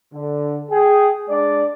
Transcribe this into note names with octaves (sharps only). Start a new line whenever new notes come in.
D3
G#4 G5
G#3 D4 D5